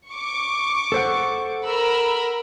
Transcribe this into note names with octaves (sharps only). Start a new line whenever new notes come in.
C#6 D6
A4 C5 F#5
A#4 B5 E6